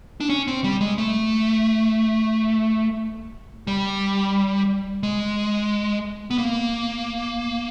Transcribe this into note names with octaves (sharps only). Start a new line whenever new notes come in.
D4
C#4
C4
G3
G#3
A3
G3
G#3
B3
A#3